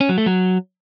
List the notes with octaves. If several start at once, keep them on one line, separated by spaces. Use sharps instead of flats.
C#4
F#3
A3
F#3